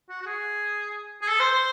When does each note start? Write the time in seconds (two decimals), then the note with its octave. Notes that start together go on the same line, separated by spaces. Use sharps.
0.09 F#4
0.21 F#4
0.26 G#4
1.21 G#4
1.28 A4
1.40 C5
1.51 C5